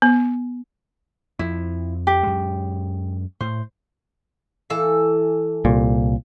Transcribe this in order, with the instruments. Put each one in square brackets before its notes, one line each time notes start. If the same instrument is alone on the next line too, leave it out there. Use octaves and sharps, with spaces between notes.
[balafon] B3
[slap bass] F2 F3 [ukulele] E4
[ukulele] G4
[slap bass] F#2 G#3
[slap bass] A2 [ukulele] C5
[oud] E3 A4 F5
[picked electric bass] C2 A#2